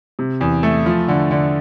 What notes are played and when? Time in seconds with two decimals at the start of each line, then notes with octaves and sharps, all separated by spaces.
0.19 C3
0.41 E2
0.63 A3
0.86 F3
1.08 D3
1.31 D3